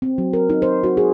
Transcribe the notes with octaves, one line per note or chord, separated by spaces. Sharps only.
C4
F#3
A#4
D#4
C5
F#4
G#4